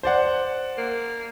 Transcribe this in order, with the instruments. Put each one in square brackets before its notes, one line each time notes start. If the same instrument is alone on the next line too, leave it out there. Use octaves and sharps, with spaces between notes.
[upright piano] C5 D5 F#5
[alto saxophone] A#3